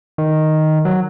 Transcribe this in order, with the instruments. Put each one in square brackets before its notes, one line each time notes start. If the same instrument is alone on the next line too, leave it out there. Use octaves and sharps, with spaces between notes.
[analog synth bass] D#3
F#3